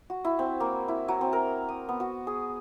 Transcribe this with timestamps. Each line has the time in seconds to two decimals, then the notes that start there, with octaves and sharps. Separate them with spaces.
0.10 F#4
0.25 E4
0.39 C4
0.60 A#3
0.88 E4
1.08 F#3
1.21 C4
1.33 A#4
1.69 D#6
1.89 B3
2.00 F#4
2.27 G#4